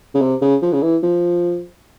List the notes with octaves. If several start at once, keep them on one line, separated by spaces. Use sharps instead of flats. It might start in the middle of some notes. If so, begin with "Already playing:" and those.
C#3
C3
C#3
F3
C#3
E3
F3